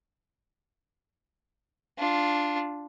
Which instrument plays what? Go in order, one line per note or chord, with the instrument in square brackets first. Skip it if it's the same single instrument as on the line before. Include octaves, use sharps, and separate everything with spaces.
[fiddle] D4 F4